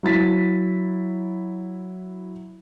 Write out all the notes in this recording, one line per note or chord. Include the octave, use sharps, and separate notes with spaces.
F#3 E4 A6 B6